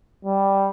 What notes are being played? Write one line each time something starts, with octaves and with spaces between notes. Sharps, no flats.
G3